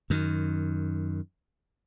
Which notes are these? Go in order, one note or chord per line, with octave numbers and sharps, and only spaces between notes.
F#2 D#3